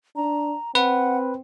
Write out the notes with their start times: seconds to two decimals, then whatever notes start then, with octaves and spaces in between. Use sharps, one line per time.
0.16 D4 A#5
0.75 C4 B4 F#5